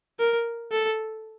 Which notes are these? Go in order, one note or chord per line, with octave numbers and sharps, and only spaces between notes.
A#4
A4